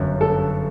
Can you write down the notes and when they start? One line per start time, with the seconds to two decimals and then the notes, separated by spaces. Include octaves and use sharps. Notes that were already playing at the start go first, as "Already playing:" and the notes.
Already playing: G1 F#2 F#3
0.21 A4